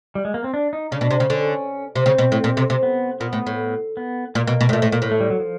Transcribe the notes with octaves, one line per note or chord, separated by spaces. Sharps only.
G3
G#3
A#3
C4
D4
D#4
C#3 D4
B2
C3
C#3
D3 C#4
C3
C#3 C4
B2
A2
A#2
C3
C3
B3
A#2 B3
A2
A2
B3
A#2 A#3
B2
B2
A2
A#2 A3
A2
A#2 A#3
A2
A3
G3
F#3
F3